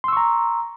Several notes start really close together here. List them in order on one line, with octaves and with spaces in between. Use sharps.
C6 E6 C#6 A#5